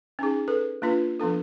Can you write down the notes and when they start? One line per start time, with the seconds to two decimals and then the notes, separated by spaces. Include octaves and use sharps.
0.19 C#4 D#4 G#4
0.48 A4 B4
0.82 A#3 D4 F4 B4
1.20 F3 B3 D4 A4